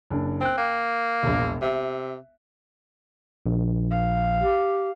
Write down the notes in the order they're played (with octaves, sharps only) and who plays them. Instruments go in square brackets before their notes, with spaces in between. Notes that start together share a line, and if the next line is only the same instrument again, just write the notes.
[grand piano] F#1 D4
[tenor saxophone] C4 [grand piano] G5 F#6
[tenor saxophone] A#3
[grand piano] E1 A#1
[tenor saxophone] C3 [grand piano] E5
[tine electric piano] A#1
[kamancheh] F5
[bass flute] G4